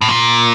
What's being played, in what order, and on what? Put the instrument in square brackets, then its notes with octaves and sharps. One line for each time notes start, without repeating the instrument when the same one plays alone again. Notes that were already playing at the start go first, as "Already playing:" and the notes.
[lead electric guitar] A2
A#2